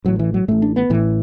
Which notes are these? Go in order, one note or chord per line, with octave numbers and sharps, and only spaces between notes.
A1 A2 F#3
E3
F#3
A1 A2 A3
D4
B3
A1 A2 E3